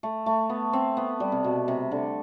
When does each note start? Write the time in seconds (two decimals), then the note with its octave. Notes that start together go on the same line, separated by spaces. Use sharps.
0.03 A3
0.26 A3
0.50 B3
0.73 C4
0.97 B3
1.20 G3
1.32 C3
1.44 B2
1.68 C3
1.91 D3